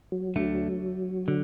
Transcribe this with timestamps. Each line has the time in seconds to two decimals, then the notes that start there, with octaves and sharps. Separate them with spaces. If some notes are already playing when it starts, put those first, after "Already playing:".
0.12 F#3
0.36 D2 D3 A3
1.28 D3